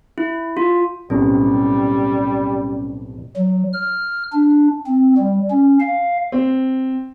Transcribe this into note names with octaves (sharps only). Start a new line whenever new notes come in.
E4
F4
B1 A2 C3 G3 C#4
F#3
F6
D4
C4
G3
C#4
F5
C4